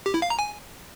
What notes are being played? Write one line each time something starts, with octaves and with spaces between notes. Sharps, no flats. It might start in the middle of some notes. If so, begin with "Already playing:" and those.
G4
E4
F5
A#5
G#5